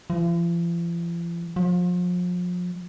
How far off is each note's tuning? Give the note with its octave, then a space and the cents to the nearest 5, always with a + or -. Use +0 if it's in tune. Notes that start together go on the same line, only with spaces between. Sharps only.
F3 -45
F3 +35